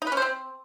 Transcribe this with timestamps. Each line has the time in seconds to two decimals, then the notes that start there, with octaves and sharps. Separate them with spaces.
0.02 D#4
0.07 B4
0.12 C#4
0.17 C5
0.22 C4